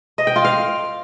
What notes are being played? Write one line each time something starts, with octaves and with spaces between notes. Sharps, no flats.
D#5
G5
F4
F5